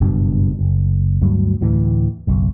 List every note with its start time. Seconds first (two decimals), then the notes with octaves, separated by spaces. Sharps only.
0.01 F#1 G2 B2 D4
0.59 F#1
1.22 D2 G2 F#3
1.61 D2 A2 E3
2.27 F#1 B1